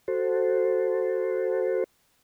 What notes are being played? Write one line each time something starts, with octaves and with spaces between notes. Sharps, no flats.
F#4 A4 C5